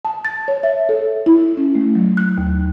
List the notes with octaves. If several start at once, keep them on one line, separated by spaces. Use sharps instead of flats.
A5
A6
C#5
E5
A4
E4
C#4
A3
F#3
F#6
D#2